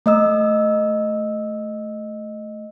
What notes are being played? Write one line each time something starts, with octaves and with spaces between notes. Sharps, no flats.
A3 D#5 E6